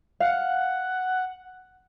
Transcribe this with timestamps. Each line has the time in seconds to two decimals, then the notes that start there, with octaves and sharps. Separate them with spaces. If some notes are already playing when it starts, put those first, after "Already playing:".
0.20 F5 F#5